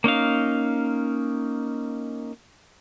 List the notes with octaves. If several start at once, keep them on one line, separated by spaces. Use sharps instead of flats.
A#3 C#4 D#4 F5